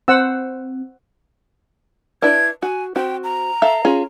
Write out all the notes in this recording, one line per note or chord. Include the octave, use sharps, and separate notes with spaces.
C4 C5 F#5 E6
D4 E4 B4 G#6
F#4 G#5
C4 F#4 G5
A#5
A4 E5 F5
C#4 F4 G#4